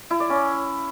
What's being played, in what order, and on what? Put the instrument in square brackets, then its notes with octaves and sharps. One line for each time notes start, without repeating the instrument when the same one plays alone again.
[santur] E4
D5
C#4